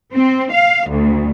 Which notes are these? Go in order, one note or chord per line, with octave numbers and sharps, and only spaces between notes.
C4
F5
D2